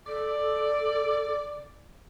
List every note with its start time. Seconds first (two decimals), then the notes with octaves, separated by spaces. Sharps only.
0.07 A4 D5